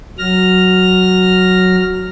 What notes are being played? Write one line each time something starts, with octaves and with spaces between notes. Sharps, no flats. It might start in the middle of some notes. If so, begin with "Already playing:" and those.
F#3 F6 A#6